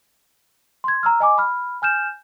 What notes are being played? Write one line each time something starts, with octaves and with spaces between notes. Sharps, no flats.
C6 G#6
A#5 E6 F6
D#5 G#5 D6
B5 F6
G#5 F6 G6 E7